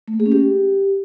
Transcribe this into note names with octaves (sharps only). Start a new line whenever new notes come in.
A3
A#3
G#4
C#4
G4